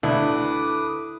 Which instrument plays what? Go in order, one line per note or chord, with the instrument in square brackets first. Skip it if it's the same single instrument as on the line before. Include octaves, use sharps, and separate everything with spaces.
[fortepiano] D2 [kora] E4 [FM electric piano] A4 [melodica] B4 D6 D#6